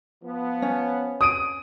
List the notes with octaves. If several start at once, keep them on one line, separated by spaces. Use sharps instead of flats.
F3 B3
C#4
D#6 D7 D#7